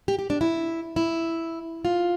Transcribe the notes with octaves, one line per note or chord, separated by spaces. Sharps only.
G4
G4
D4
E4
E4
F4